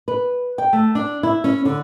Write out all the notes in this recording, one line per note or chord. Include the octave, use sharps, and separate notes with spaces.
B4
G5
A3
D4
E4
C#4
D3